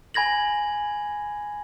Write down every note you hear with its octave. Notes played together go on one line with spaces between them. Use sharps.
G#5 B5 G#6 A#6 F#7